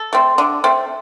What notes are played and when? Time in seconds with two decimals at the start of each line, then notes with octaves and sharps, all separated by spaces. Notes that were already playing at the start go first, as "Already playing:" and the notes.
Already playing: A4
0.13 A3 C4
0.38 D3
0.64 A3 C4